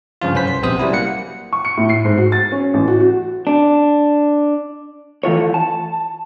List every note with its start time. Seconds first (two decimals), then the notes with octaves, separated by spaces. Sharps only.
0.21 G2 C#3 F3 F4
0.34 C2 F#2 C#4 B4 C5 B6
0.47 C6
0.62 A#1 C3 B3 C5 D#6
0.79 F#3 G3 C#4 E4
0.93 A#3 F#5 C#7
1.53 C#6
1.65 C#7
1.77 A2
1.89 C7
2.05 G#2
2.18 F#4
2.32 A6
2.52 C#4
2.74 A1
2.88 F#4
3.00 F#4
3.47 D4
5.23 E3 A3 F4 C#5
5.54 A5